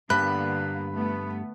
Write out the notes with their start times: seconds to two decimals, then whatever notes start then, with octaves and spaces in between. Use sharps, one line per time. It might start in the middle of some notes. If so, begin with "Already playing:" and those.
0.10 G2 D3 A#3 B3 B5 F#6
0.92 A3 B3